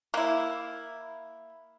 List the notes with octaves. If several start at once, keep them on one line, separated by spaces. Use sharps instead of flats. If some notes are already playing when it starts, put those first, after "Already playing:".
A#3 E4